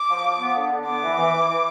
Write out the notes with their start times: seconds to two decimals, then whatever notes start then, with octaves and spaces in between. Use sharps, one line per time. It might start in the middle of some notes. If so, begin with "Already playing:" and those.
Already playing: D6
0.09 F3
0.24 F3
0.40 B3
0.55 D3
0.71 D3
0.86 B3 D6
1.02 E3
1.17 E3
1.33 E3
1.48 E3